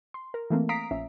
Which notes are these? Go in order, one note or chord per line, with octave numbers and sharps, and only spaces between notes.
C6
A#4
E3 A3 A#3 C4
F5 A#5 D#6 B6 C7 D7
A#1 C#4 E5